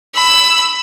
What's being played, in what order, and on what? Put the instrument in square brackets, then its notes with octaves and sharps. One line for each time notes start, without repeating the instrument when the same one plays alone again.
[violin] B5 E6